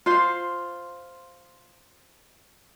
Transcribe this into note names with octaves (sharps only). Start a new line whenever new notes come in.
F4 C5